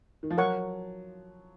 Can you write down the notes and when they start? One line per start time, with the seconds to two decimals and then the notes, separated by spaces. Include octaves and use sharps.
0.23 D#3
0.31 F3
0.38 F#3 A#4 C#5 F#5 C#6